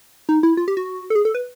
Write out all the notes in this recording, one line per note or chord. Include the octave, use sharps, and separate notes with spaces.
D#4
E4
F4
G4
F#4
A4
G#4
A4
B4